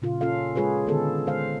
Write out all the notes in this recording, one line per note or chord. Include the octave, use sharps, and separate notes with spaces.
A#2 C#3 F4
C#4 F4 A4 F5
G#3 F4 G#4 B4 C#5
D3 D#3 B3 G#4 A4
G#3 C5 F5